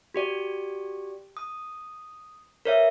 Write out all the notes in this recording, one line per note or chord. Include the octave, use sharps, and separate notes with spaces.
F#4 G4 D5
D#6
A#4 B4 C#5 D5 E5